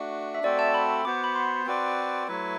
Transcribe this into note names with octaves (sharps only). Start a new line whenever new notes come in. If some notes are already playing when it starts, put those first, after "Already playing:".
Already playing: A3 D4 F#4
E5
A3 C4 F#4 A4 D5
A5
B5
B3 F#4 C5 D6
B5
C6
C4 F#4 B4 D5
F#3 A3 E4 B4